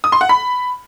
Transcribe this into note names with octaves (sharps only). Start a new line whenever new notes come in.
D#6
C6
F#5
B5